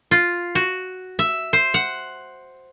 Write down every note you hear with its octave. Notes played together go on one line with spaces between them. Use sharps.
F4
F#4
E5
C5
F#5